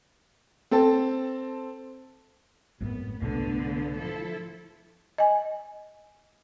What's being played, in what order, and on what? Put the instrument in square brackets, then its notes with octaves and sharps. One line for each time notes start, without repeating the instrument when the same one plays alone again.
[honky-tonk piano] C4 A4 A5
[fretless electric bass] G#1 F#2 A2 [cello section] B3
[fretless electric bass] C2 G#2 B2 [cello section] D3 A3 B3
[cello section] F3 E4 A4
[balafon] D#5 G#5